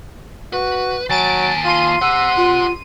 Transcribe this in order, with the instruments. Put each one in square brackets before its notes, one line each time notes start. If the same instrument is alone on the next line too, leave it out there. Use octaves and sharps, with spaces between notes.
[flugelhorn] F#4 [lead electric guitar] B4
[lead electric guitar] D#2 A5 [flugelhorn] F#3 [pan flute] G#5 [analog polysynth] A6 D7
[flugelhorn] F4 [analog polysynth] C6 D#7
[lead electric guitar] G4 C5 [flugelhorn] F#5 [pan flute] E6
[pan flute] F4